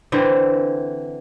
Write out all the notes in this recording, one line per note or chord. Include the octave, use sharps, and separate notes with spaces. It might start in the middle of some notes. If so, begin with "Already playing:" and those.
D3 E3 C4